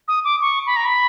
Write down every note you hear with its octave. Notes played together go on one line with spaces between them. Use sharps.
D#6
D6
C#6
B5
A#5
B5